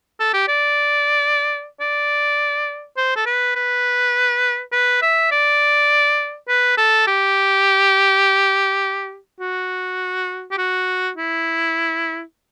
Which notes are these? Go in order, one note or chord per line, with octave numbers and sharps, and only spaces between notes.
A4
G4
D5
D5
C5
A4
B4
B4
B4
E5
D5
B4
A4
G4
F#4
G4
F#4
E4